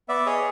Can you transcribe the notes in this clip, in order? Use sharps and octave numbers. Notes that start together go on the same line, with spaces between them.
B3 D5 E5
G#4 C#5 D#5